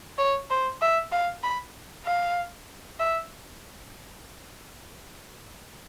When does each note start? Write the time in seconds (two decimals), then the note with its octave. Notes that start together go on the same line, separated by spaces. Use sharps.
0.18 C#5
0.51 C5
0.82 E5
1.12 F5
1.44 B5
2.06 F5
3.00 E5